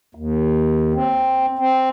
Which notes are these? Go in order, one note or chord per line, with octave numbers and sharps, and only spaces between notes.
D#2
C4
C4